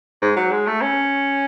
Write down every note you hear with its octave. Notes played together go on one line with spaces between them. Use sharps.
G#2
F#3
G#3
A3
C#4